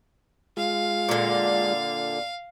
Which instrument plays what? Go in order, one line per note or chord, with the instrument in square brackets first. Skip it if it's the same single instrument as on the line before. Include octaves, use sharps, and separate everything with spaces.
[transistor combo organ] G#3 F4 [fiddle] F5
[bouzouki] A#2 D3